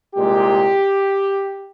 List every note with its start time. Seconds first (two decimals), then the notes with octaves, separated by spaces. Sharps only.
0.16 C2 A#2 G#3 G4